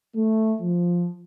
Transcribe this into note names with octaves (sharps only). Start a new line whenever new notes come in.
A3
F3